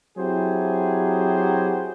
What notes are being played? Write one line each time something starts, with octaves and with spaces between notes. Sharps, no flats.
F#3 C4 E4 G4 G#4 C5